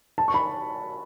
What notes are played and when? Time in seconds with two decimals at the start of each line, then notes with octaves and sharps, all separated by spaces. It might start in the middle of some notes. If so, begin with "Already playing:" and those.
0.18 A5
0.28 C#6
0.34 B5